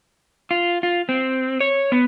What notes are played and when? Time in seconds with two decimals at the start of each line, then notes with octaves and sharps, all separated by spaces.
0.51 F4
0.83 F4
1.09 C4
1.60 C#5
1.92 B3